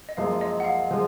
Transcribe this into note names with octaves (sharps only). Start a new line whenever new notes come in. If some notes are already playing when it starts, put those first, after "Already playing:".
D#5
F#1 F#2 F3 G#3 F5
D#5
F#5
F5
F3 G#3